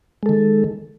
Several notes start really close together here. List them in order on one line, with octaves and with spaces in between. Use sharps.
G#3 A4 D#3